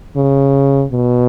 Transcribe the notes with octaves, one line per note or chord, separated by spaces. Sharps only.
C#3
B2